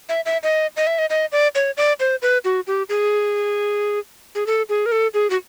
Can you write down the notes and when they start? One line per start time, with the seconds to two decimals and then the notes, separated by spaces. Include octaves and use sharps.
0.09 E5
0.26 E5
0.43 D#5
0.77 D#5
0.87 E5
0.99 D#5
1.10 D#5
1.32 D5
1.55 C#5
1.77 D5
2.00 C5
2.22 B4
2.45 F#4
2.67 G4
2.89 G#4
4.35 G#4
4.47 A4
4.69 G#4
4.86 A#4
4.92 A4
5.14 G#4
5.30 F#4